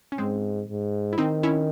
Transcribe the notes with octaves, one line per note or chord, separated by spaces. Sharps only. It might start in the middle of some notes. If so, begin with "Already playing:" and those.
C#4
G#2 G#3 C4
G#2
E4
D#3 C4 D#4
C#4 E4